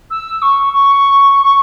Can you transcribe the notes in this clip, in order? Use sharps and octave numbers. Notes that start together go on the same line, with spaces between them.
E6
C#6
C#6